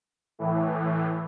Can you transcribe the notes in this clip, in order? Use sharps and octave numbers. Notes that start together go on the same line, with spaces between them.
A2 E3